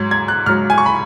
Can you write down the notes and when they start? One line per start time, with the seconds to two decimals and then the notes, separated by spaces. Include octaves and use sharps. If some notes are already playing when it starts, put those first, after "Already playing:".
Already playing: G#2 F#3 G#6
0.11 G#6
0.28 F#6
0.46 G#2 F#3 F6
0.70 G#5
0.78 C#6
0.86 B5